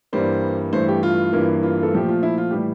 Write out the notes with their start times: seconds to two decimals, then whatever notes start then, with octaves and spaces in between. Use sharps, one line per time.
0.13 G2 E3 G3 A#3 C5
0.73 G2 E3 A3 C5
0.88 G4
1.03 F4
1.33 G2 E3 A#3
1.63 F4
1.83 A4
1.93 A#2 F3 A3 G4
2.09 F4
2.23 E4
2.38 F4
2.51 A2 E3 G3 G4